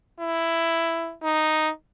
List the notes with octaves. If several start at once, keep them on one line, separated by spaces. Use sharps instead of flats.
E4
D#4